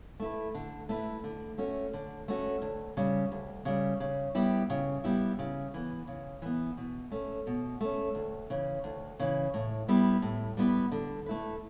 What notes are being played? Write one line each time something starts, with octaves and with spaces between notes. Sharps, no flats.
A3 E4 B4
D3
A3 E4 B4
D3
A3 C#4 F#4
D3
A3 C#4 F#4
D2
C#3 G3
D2
C#3 G3
C#3
G3 B3 E4 G4
C#3
G3 B3 E4 G4
C#3
E3 B3
C#3
E3 B3
B2
A3 C#4
B2
A3 C#4
D2
C#3 E3
D2
C#3 E3
A2
G3 B3 E4 B4
A2
G3 B3 E4 B4
D3
A3 E4 B4